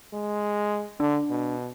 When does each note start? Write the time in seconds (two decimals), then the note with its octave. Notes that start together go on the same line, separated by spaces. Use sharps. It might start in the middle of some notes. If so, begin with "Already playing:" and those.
0.13 G#3
1.00 D3 D4
1.30 B2